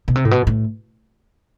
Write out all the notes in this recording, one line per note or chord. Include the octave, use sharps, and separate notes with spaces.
B2
C3
A2
B2
A2